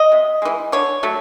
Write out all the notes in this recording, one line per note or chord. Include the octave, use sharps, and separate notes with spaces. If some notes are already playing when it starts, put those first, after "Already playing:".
Already playing: D#5
C3
E3 G#3
D3 C#5
F#3 A3